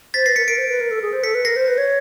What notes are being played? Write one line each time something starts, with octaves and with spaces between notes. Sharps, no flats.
C5 A6 B6
B4 A#6 C7
A#4 B6 C#7
A#4 C7 D7
C5
B4
A#4
A4
G#4
C5
A4 B6 C#7
B4
A#4 A#6 C7
C5
B4
C#5